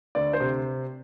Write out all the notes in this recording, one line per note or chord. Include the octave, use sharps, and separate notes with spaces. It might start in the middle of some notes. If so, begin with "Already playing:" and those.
D2 D5
C5
C3